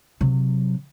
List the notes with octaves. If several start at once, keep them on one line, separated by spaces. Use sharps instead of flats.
C3 F#3